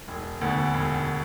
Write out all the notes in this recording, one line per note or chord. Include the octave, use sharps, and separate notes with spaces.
E1
D2 D3 B3
E1